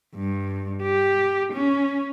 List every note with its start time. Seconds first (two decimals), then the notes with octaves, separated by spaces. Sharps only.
0.15 G2
0.83 G4
1.53 C#4